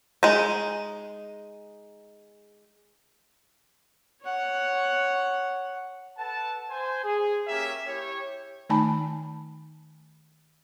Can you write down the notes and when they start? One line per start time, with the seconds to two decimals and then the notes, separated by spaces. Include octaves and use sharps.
0.23 G#3 D#4
4.22 C#5 F#5
6.18 A4 B4 F#5 A5
6.69 C5 G#5
7.04 G#4
7.48 A#3 C#4 G4 A#4 C#5 E5
7.87 E4 G4 C#5
8.69 D#3 A3 D#4 G#5 A5 B5